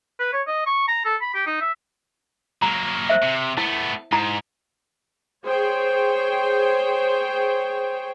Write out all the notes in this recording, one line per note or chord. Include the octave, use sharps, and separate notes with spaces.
B4
C#5
D#5
C#6
A#5
A4
B5
G4
D#4
E5
F#3 A#3 A#5
C5 E5
C3
A3 B3 E4
G#2 E4 A#5
G#4 C5 C#5 G5